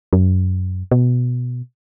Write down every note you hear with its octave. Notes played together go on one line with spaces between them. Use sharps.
F#2
B2